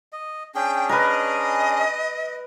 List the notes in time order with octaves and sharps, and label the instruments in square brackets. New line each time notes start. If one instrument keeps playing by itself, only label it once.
[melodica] D#5
[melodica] C#4 D4 G#4 [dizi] G5
[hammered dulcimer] A#4 B4 [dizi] D#5